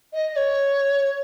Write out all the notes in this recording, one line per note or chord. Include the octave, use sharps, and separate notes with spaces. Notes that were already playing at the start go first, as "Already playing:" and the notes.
D#5
D#5
C#5